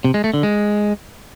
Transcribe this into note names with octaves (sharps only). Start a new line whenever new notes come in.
C3
G#3
A3
D3
G#3